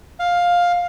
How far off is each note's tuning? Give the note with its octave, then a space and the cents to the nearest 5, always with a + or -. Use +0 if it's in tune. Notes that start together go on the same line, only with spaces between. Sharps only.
F5 +10